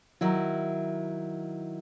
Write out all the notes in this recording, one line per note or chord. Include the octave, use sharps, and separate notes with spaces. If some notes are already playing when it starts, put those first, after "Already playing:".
D#3 F#3 E4